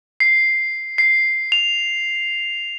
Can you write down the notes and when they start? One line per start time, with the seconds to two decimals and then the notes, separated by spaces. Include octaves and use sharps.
0.20 C7
0.98 C7
1.52 F7